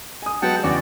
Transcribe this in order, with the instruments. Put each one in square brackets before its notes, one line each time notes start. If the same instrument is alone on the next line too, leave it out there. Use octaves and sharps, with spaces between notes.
[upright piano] G#5 D#6
[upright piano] F#3 G#3 B3 [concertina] F#5 G5 A5
[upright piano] E2 C#3 [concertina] F#4 D5